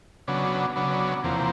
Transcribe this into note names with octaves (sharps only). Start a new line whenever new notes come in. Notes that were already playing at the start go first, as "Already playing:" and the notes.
C#3 F#3 B3 D4
C#3 F#3 B3 D4
E2 C3 F3 A#3